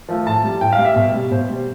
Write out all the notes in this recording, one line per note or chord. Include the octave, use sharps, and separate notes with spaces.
F3 A3
A2 A5
G3
A2 G5
F5
G3
E5
B2
G3
B2 C5
G3